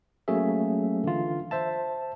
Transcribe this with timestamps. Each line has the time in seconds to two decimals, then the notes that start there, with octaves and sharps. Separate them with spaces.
0.28 F#3 A3 A#3 C#4 G#4 E5
1.04 D3 E3 F4
1.51 C5 E5 A5